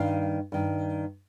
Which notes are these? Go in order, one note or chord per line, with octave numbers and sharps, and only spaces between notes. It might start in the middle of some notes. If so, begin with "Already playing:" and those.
Already playing: G2 D#3 F5
G2 D#3